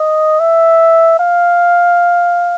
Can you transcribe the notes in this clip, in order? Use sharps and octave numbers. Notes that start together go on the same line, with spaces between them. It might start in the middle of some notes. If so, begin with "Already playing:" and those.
Already playing: D#5
E5
F5